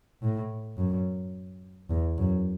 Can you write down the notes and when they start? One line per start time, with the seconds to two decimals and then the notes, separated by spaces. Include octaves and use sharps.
0.22 A2
0.77 F#2
1.90 E2
2.18 F#2